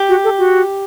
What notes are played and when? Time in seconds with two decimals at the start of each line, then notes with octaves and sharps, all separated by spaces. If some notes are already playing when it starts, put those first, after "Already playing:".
Already playing: G4
0.09 F#4
0.24 A4
0.38 F#4